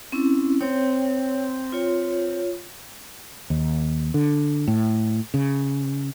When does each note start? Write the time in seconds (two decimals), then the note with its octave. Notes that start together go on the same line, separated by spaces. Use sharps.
0.12 C4 C#4 E4
0.61 C4 C#5
1.72 F4 C#5
3.50 D#2
4.14 D3
4.68 A2
5.34 C#3